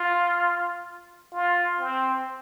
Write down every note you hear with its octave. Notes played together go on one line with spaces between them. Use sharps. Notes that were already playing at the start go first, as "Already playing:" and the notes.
Already playing: F4
F4
C4